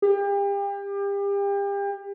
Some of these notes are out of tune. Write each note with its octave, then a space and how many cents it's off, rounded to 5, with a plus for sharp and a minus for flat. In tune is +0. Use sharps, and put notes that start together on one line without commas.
G4 +35